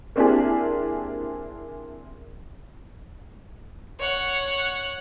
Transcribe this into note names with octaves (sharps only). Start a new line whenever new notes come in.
A#3 C4 D4 E4 G4 G#4
C#5 F#5